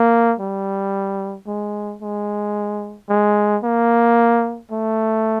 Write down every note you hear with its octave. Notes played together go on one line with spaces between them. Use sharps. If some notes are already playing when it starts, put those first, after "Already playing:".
Already playing: A#3
G3
G#3
G#3
G#3
A#3
A3